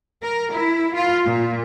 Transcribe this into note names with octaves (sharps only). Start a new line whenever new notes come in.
A#4
E4
F4
A#2